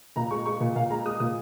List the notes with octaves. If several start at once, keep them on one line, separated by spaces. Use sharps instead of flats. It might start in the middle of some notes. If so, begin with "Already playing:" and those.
A#2 A#5
G#3 C#6
G#3 C#6
A#2
A#2 F5
G#3 A#5
G#3 D#6
A#2 D#6